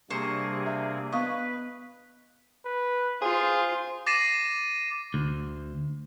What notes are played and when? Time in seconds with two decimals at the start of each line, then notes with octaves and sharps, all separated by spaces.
0.10 C3 G3 A#3 D4 G#4 C5 C#6
0.66 E5
1.12 B3 B4 D#5 F5 C#6
2.65 B4
3.22 F4 G#4 C5
4.07 D6 A6 A#6 C7 D#7 E7
5.14 D2